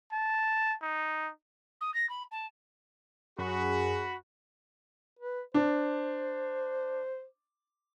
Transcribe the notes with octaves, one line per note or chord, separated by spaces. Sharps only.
A5
D#4
D#6
A#6
B5
A5
F#2 F#4 G#4 B5
B4
D4 C5